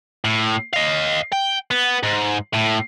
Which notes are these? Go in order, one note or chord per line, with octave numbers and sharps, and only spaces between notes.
A2
D#5 F5
G5
B3
G#2
A2